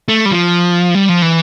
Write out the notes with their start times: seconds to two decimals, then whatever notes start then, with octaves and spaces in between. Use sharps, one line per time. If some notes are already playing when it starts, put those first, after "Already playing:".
0.08 A3
0.25 G3
0.31 F3
0.95 G3
1.09 F3
1.22 E3